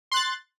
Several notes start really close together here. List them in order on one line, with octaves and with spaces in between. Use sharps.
C6 F#6 A6